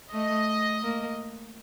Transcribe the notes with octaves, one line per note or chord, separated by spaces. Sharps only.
A3 D#5
A#3